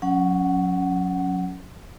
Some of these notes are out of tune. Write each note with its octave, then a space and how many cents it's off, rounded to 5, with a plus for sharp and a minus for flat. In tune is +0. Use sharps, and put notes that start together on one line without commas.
F#3 -35 C#4 +0 F#5 +15